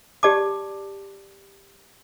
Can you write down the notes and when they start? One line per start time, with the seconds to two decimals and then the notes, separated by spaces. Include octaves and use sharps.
0.23 G4 D5 A5 D6